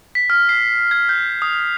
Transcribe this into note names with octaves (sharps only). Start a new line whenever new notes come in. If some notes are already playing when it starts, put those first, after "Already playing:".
B6
F6
C7
G#6
G6
D#6